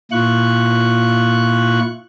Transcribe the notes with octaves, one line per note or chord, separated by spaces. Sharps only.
A#2 E4 F4 C#6 F#6